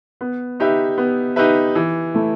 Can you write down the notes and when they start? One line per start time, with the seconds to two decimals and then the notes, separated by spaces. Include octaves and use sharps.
0.21 B3
0.60 D#4 G4 B4 E5
0.98 B3
1.36 D#4 G4 B4 E5
1.75 E3
2.14 A3 E4